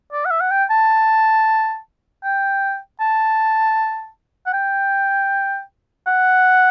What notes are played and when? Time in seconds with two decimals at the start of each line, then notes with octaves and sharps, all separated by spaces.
0.13 D5
0.25 F#5
0.31 E5
0.41 F#5
0.51 G5
0.70 A5
2.24 G5
3.01 A5
4.46 F#5
4.53 G5
6.07 F#5